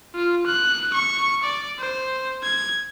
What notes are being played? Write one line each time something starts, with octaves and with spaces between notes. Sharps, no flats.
F4
F#6
C#6
D5
C5
G#6